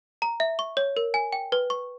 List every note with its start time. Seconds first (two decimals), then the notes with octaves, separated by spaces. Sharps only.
0.22 A#5
0.40 E5
0.59 C#6
0.77 C#5
0.97 A#4
1.14 G#5
1.33 G5
1.52 B4
1.70 C#6